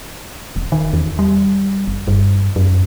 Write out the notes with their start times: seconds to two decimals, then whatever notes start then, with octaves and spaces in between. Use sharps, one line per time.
0.56 E1
0.72 D#3
0.93 E2
1.19 G3
1.87 F#1
2.07 G2
2.56 F#2